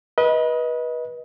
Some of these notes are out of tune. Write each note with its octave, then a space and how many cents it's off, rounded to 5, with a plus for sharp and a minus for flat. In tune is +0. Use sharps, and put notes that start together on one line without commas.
B4 -25 D#5 +20